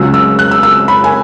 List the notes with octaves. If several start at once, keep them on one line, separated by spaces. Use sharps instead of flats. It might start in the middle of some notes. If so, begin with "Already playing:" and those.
Already playing: C#2 C#3 F#3 E6
E6
F#6
E6
E6
B5
G#5